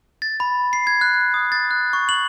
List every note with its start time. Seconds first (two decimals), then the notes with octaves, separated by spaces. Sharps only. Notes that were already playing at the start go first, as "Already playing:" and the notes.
0.22 A6
0.40 B5
0.73 C7
0.87 G#6
1.01 F#6
1.34 D#6
1.52 A6
1.71 F#6
1.93 C#6
2.09 F#7